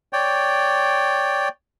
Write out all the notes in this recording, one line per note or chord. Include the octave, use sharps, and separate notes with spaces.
C#5 D5 G5